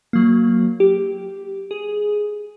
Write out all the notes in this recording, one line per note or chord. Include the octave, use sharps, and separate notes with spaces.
F#3 A#3
G4
G#4